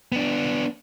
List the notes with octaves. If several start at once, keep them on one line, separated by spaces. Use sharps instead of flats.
B3 D4